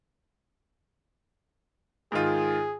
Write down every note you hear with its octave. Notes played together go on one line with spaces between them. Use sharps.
G#2 D#3 F4 G#4